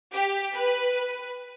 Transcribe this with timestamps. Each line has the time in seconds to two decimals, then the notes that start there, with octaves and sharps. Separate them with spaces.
0.12 G4
0.53 B4